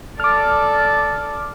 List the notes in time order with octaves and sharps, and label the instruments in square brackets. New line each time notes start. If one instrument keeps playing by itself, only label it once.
[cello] A4 D5 [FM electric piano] D6 F6